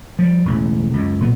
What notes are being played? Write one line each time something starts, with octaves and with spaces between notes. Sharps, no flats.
F3 G3
E1 A1 C#3
C#2 F#2
B1 A#2 B3